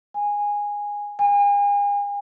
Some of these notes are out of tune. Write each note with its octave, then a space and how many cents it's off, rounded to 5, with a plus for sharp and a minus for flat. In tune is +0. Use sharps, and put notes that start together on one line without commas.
G#5 -10
G#5 -40